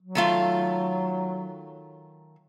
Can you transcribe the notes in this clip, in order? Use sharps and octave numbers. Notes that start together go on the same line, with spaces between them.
F#3
D#3 A3 F4